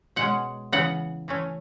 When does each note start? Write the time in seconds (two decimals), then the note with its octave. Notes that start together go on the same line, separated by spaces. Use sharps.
0.16 B2 G#3 C#4 F#5
0.72 C#3 E3 B3 F#5
1.28 E3 A3 C#4